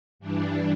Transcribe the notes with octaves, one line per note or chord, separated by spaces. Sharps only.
G2 E3 G3 D4